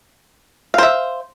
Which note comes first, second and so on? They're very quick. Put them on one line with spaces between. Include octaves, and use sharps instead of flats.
F5 C5 E5